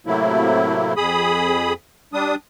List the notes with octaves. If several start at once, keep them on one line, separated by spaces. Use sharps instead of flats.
A2 C3 F#3 A3 A#3 E4
F2 G#4 B5 D#6
G3 D4 D#6